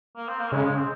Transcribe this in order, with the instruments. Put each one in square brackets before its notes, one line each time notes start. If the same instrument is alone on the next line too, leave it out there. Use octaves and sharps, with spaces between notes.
[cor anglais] A#3
C4
A#3
[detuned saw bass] C#3 [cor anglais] G#3
[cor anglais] G#3
C4